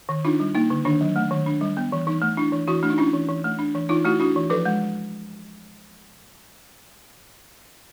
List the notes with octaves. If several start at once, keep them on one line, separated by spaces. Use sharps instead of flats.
D#3
D4 D#4 F4
G3
A#3 D#4
D3
D#3 D4
F#3
A3
D#3
D4
G3
B3
E3
E3 D#4
A3
D4 E4
E3
E3 E4 F#4
A3 D4
D#4
C#4 D4 E4
E3
E3
A3
D4
E3
E3 D#4 F4
A3 E4 F#4
D4 E4 F#4
E3
F3 A4 B4
G#3